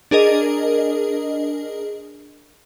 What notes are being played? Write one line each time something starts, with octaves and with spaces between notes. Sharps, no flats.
D4 G#4 A#4 D#5